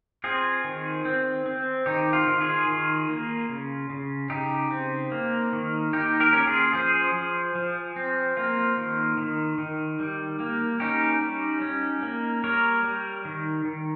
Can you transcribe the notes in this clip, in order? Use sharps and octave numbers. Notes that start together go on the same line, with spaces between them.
C4 F4 G#4
D#3
C4
C4
D#3 D#4 G4
F4
D#3
F4 G#4
D#3
A#3
C#3
C#3
C#3 D#4 G4
C4
A#3
D#3
A#3 D#4 G4
G4 A#4
C#4
F4 G#4
F3 G#4 C5
F3
F3
C4
A#3 F4
D#3
D#3
D#3
G3
A#3
C#4 D#4 G4
G3
C#4
A#3
G3 A#4 C#5
G3
D#3
D#3